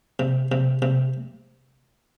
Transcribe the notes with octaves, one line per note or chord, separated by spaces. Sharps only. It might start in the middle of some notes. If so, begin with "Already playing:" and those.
C3
C3
C3